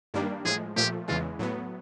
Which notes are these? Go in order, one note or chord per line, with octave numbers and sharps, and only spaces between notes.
G2 D#3 G3 A#3 D4
A2 F3 G#3 G#4
A#2 F3 A3 G4
E2 C#3 E3 G#3 F4
A2 F#3 B3